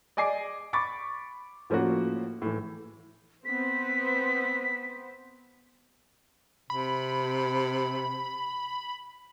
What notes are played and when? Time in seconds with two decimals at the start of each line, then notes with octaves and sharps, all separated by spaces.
0.17 D5 D#5 G#5 D6 C7
0.73 B5 C#6 D6 A6
1.70 A2 F3 A#3 C#4 F#4
2.42 A2 E3
3.45 B3 C4 C5 B6
6.70 C3 B5